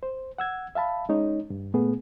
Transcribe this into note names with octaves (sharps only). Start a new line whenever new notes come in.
C5
F#5 E6 G#6
E5 F5 A5 B5
G#3 C#4 D#4 C#5
G2
A#2 A3 B3 G#4